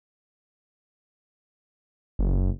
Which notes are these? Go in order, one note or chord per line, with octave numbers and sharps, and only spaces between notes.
F#1